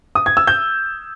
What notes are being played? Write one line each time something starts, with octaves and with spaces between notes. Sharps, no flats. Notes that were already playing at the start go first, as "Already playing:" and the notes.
D#6
G#6
E6
G6